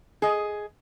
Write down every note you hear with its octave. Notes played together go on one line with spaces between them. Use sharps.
G#4 D#5